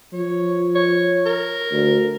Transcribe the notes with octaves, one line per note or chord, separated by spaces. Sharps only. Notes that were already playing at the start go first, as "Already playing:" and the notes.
F3 C#5
C#5
A#4
D2